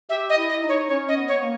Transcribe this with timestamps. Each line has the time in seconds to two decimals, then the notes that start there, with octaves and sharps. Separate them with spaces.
0.09 G4 E5
0.30 D#5
0.36 E4
0.49 D#5
0.63 D#4
0.69 C#5
0.89 C#4 C#5
1.08 D#5
1.15 B3
1.28 C#5
1.33 B3
1.41 A#3